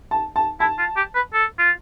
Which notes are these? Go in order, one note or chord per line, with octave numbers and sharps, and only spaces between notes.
A5
A5
E4 A5
F4
G4
B4
A4
F4